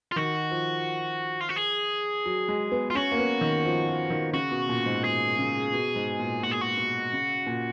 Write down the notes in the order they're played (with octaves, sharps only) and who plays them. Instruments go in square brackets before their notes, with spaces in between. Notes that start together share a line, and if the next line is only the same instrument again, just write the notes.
[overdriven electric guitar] F4
[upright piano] D#3 [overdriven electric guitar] F#4
[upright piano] F3
[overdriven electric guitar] F4
F#4
G#4
[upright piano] F#3
G#3
B3
[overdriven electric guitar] F4
[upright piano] C#4 [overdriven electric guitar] F#4
[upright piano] A#3
B3
D#3
F3
F3
D#3
[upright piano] C#3 [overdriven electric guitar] F#4
[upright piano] B2
A#2
G#2
[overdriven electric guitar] G#4
[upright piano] C#3
B2
G#2
A#2
[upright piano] A#2 [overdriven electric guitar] F#4
[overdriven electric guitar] G#4
F#4
[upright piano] B2
C#3
A#2